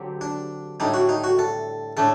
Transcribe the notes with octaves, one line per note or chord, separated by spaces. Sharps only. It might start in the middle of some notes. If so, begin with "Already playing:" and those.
Already playing: D3 F#3 C4 G4
D4
A2 G3 D4 D#4
F#4
D#4
F#4
A4
A2 A3 D4 A4